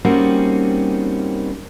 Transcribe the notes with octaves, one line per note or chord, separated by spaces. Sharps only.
G3 A#3 C4 C#4 D#4 F#4